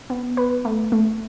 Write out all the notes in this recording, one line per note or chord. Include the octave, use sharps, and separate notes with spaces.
B3
B4
A3
A3